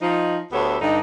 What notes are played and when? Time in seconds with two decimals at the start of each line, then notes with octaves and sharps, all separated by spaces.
0.01 F3 D#4
0.52 D2 B3 G4 A4 C#5
0.81 G2 D3 D#4